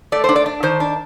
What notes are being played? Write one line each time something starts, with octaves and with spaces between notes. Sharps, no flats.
A3 D5
D4 C5
D5
D4
D#3 C5
D4